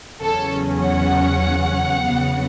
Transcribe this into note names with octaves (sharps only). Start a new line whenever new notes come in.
E2 C#3 F#3 C#4 A4
F#5
E2 C#3 F#3 B3